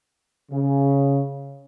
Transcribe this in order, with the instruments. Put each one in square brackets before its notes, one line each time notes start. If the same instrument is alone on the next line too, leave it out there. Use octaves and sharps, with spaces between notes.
[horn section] C#3